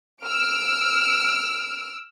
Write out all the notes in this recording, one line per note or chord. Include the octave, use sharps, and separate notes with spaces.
E6 F6 D7